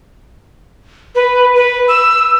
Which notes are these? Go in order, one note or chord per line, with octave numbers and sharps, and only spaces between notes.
B4
B4
E6